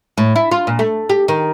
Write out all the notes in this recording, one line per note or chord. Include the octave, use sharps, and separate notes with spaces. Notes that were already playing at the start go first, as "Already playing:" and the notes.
A2
E4
F4
A#2
A3
G4
D#3